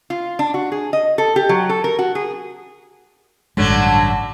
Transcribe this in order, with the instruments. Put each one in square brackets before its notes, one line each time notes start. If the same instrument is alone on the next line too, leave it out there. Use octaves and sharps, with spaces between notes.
[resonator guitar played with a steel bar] F4
D4
F#4
G#4
D#5
A4
G4
F#3
A4
A#4
F#4
G#4
[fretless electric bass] A1 G2 G#3 [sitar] D3 F#3 A3